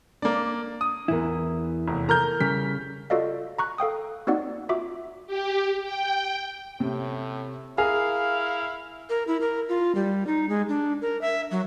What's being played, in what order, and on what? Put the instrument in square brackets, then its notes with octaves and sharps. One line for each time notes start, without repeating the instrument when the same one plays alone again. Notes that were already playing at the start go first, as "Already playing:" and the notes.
[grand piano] A#3 D5 [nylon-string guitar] D4
[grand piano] D#6
[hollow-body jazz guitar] E2 E4 [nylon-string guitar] E3 B3 A#4
[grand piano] F1
[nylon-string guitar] A4 A#4 [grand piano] A#5 F6 G6
[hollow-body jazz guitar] C#3 G3 [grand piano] B6
[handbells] F4 F#4 A4 D5 D#5 F5
A#5 C#6 F#6
A4 F5 G5 D#6
A#3 C4 D#4 F#4 D5 F#5
F4 F#4 E5 D6
[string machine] G4
G5
[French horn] A2 [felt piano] C3
[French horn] E4 [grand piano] G#4 [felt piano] A#4 [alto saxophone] F5
[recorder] A#4
E4
A#4
F4
G3
D#4
G#3
D4
A#4
E5
F#3